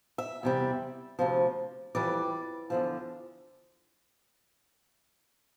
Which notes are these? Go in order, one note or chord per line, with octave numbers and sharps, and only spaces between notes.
E5
E2 C3 G3
D2 C3 F3
F2 E3 G3 D5
E2 D3 F3